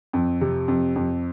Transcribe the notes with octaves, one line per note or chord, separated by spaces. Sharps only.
F2
C3
F2
F2